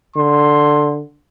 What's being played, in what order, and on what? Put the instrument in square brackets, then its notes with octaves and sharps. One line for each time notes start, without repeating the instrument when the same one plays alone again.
[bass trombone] D3 [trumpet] C6